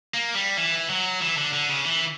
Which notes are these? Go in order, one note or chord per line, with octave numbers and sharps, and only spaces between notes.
A#3
G3
E3
F#3
E3
D3
D3
C#3
E3